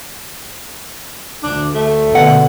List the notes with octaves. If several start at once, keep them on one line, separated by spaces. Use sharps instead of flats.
D2 D4
A3
B2 D3 F#5